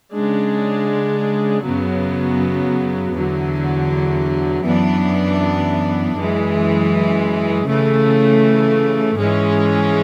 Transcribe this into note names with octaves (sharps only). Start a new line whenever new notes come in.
C#3 G#3 D4
F#2 C#3 F#3 B3
E2 D3 F#3
F#2 E3 B3 D4
F#2 E3 G#3
C#3 E3 A3
G#2 E3 G#3 C#4